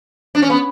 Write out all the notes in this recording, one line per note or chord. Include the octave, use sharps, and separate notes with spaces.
D4
C#4
B3